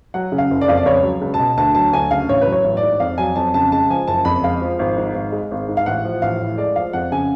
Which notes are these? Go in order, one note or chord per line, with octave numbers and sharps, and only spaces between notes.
F#3 F#5
C#3
F5
F#1
D5
F2 F5
D5
C#2 C#5
F#3
C#2
A5
B2
D2 A5
F#3 A5
D2 G#5
C#3 F5
A1 C#5
B4
F#3
C#5
A1
D5
G#2
F2 F5
F#3 G#5
F2 A5
C#3 A5
G#3 A5
F3 G#5
F#1 A5
F2 B5
G#3 F5
F3
G#1
G#2
G#1
G#3
G#1
G#2
F5
A1 F#5
F3
A1 F5
A2
G#3 D5
F3 F5
F2 F#5
C#3 G#5